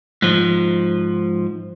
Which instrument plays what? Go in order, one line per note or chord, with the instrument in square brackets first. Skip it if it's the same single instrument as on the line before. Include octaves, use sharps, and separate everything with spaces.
[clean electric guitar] G#2 F3